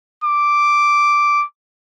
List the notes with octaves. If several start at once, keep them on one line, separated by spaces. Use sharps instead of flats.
D6